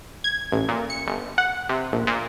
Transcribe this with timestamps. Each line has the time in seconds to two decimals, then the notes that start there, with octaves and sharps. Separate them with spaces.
0.24 G#6
0.52 A1
0.69 A#2
0.90 C#7
1.07 G1
1.38 F#5
1.69 C3
1.93 A#1
2.07 A#2